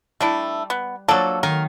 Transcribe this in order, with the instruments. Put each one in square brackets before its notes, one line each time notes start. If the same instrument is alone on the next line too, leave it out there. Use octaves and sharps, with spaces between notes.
[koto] G3 [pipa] A3 D4 E4
[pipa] B3
[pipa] F3 D4 A4 [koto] F#3 A#3
[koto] D#3 [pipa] A#4